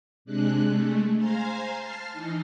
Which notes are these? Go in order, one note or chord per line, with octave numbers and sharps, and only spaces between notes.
C3 G#3 D4 F#6
G#3 A3
C5 F5 G#5 A#5 C6
A5 F6 C7
E3 D#4